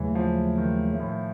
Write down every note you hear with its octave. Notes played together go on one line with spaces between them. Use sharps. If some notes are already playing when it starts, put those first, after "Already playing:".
Already playing: D#2 C#3 E3 F#3 A3
F3
D#3
A2